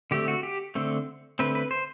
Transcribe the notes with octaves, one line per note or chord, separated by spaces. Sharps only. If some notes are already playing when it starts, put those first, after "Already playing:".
D3 A3 C4 G4
F#4
G4
D3 A3 C4
D3 A3 C4 B4
B4
C5